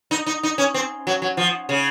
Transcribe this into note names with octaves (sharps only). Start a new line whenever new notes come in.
D#4
D#4
D#4
C#4
C4
F#3
F#3
F3
C#3